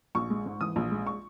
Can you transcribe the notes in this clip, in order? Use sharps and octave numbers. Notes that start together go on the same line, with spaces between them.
A#1 C#6
G#3
G#2
E3 D#6
A#1
G#3
C#6